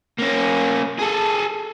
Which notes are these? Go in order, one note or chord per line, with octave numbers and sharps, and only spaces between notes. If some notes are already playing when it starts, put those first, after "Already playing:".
A#3 C#4
G#4 A4